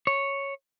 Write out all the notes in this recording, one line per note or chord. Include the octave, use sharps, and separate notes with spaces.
C#5